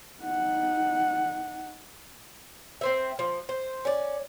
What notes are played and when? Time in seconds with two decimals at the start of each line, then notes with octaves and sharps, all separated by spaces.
0.22 D#4 F#5
2.81 C4 C5 E5
3.19 F3
3.49 C5
3.85 C#4 D5